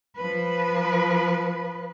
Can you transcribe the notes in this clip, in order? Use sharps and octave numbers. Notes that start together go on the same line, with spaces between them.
F3 B4